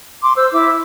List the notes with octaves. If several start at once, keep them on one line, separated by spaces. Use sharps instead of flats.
C6 D6
C5 E6
E4 E5 D6